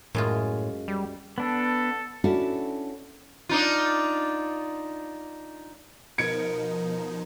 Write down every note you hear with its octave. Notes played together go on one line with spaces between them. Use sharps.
F#2 A2 G#3 F4
G3
B3 D4 A4
C#4 D4 E4 F#4 A4
D4 D#4 F4
B2 F3 D#4 A#4 B4 G#6 C#7 D7